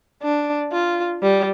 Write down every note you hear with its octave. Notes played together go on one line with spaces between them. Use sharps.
D4
F4
G3